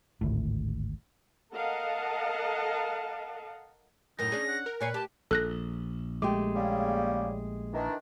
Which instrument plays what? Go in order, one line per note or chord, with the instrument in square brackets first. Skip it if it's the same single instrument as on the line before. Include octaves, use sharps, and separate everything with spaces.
[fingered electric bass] G#1 D2 A2
[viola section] A4 A#4 D#5 F5 F#5 A5
[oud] F#2 A2 A#4 [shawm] D#4 [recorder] A#6
[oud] C#4 D4 [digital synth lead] G#4
[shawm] F#5
[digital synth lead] A#4
[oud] A#2 C#5 F5 [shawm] B4 [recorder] G#5
[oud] G4 [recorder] A5
[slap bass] A#1 [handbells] A4 F#6 A#6
[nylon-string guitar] G#3 A3 G4 [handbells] D6
[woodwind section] C#3 G3 A#3
D#3 E3 D4